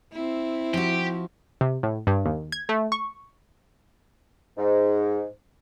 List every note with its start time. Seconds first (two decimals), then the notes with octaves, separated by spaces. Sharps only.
0.13 C4 E4
0.74 F3 F#4 G4
1.61 C3
1.83 A2
2.07 G2
2.25 D#2
2.52 G#6
2.69 A3
2.92 C#6
4.57 G#2